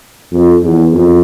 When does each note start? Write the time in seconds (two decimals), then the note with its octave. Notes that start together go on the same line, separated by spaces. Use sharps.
0.32 F2
0.63 E2
0.93 F2